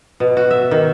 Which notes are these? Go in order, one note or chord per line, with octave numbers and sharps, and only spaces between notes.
B2
F#4
E5
D#3